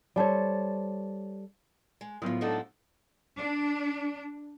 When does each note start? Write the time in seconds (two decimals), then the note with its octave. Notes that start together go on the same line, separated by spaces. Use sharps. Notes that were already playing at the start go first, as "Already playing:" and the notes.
0.16 G3 A4 C5 C#5
2.01 G#3
2.22 A2 D#3 F3 F#3 B3 F4
2.41 G#3 C4 D4 D#4 F#4 A4
3.38 D4